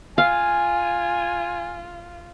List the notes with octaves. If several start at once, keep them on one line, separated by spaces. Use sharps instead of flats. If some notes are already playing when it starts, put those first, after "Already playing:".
F4 F5 G#5